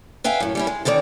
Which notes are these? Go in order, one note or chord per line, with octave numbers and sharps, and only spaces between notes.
B4 E5 F5 G5 G#5
F#2 A2
G3 C#4 E4
G#3
D3 D#3 C4 A#4 D5